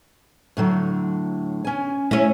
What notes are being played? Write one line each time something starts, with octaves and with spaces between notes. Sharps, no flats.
A2 D3 F#3
C#4 G#5
A3 C#4 E4 E5